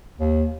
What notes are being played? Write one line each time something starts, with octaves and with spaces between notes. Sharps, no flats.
D#2